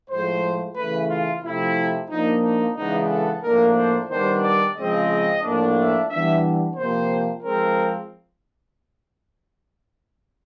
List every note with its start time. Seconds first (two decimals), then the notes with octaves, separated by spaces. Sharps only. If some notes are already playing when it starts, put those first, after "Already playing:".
0.10 A2 F3 G#3 C5
0.76 C#3 E3 A3 B4
1.10 F4
1.43 C3 F3 A3 E4
2.10 F3 A#3 D4 D#4
2.44 D#4
2.76 C#3 E3 G#3 B3 D4 D#4
3.10 A4
3.43 A2 F3 A#3 D4 A#4
3.76 C5
4.10 D#3 G3 B3 D4 C5
4.43 D5
4.76 C#3 F3 G#3 C4 D#5
5.43 A2 F3 A#3 D4
5.77 E5
6.09 E3 G3 B3 D4 E5
6.76 C3 F3 A#3 C5
7.43 F3 G#3 C4 A#4